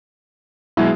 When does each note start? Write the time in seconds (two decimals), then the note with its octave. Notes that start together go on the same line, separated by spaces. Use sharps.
0.77 B2 F#3 G#3 E4